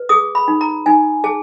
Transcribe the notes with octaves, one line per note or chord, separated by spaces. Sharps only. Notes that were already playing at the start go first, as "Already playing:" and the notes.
Already playing: B4
G#4 D#6
B5
D#4
A#5
D#4 G#5
G#4 A5